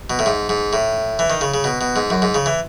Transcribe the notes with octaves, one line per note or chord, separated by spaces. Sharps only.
B2
A2
G#2
G#2
A2
E3
D#3
C#3
C#3
B2
B2
G#2
F#2
G#2
C#3
E3